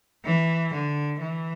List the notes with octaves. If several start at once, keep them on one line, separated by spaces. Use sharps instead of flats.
E3
D3
E3